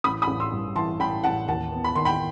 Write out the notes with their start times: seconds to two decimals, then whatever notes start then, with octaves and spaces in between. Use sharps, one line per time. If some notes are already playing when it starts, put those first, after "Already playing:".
0.04 A1 B5 D#6
0.22 B5 D#6
0.27 A1
0.40 C6 E6
0.52 G2
0.76 E3 A5 C6
1.00 A1 G5 B5
1.24 A1 F#5 A5
1.48 D#2 F#5 A5
1.72 B3
1.84 B5
1.95 D#3 C6
2.05 G5 B5